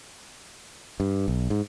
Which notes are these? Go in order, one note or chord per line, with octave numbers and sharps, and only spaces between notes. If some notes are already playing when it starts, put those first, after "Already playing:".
G2
B1
G#2